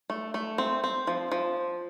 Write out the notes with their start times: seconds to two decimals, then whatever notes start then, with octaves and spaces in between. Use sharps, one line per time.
0.10 A3
0.34 A3
0.58 C4
0.84 C4
1.07 F3
1.32 F3